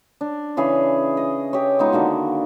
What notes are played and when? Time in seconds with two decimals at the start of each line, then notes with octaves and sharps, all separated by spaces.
0.21 D4
0.57 C#3 E3 G#4 C#5
1.17 D#5
1.53 G4 C#5
1.79 G#3 B3 D#4 F4
1.92 D3 D#3 A#3 F#4